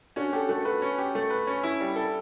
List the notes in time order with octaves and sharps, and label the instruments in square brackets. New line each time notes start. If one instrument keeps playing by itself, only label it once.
[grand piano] C#4 [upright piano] D4 F#4
[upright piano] F#4 A4 [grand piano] G4
[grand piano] A3 [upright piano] F#4 A4
[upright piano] F#4 A4 [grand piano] B4
[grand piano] C#4
G4
A3
B4
C#4
E4
G3
A4